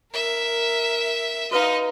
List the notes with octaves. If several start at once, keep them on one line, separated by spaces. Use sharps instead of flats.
A#4 E5
D#4 F#4 B4 D#5 F5